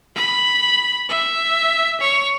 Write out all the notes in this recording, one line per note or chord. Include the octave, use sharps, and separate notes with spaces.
B5
E5
C#5